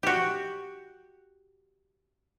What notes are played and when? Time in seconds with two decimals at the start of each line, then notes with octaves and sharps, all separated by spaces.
0.03 F#4 G4